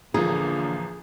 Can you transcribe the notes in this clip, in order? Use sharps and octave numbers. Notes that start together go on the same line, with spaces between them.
A1 D3 F3 A#3 G#4 A#5